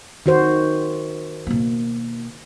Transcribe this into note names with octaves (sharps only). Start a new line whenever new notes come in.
D#3 F#4 C5
B2 A#3